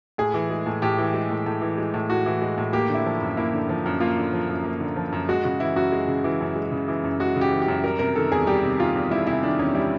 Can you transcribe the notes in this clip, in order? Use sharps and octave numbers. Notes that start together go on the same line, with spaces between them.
A2 G#4
E3
G#3
A2
A2 G4
E3
G#3
A2
A2
E3
G#3
A2
A2 F#4
E3
G#3
A2
A#3 G4
D3
E4
F3
F#2
A#3 E4
D3
F3
F#2
A#3 F4
D3
F3
F#2
A#3
D3
F3
F#2
G#3 F#4
C#3 F#4
E3 E4
F#2 F#4
G#3
C#3
E3
F#2
G#3
C#3
E3
F#2
G#3 F#4
C#3
G4
E3
G4
F#2
G3 A#4
C3 A#4
D#3 A4
E2 G#4
G3 G4
C3
D#3 F4
E2
G3 E4
C3 E4
D#3 D4
E2 C#4
G3 E4